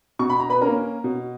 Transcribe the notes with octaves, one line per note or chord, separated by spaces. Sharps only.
B2 C#6
B5
A#5
B4 B5
A#3 C#4 A#4 A#5
B2